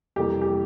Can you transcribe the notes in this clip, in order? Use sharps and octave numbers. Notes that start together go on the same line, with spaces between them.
F2 C3 E3 G3 A#3 G4
G4